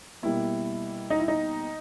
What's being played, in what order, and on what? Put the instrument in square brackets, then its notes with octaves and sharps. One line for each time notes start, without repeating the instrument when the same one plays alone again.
[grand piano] B2 G3 A#3 E4
D#4
E4
D#4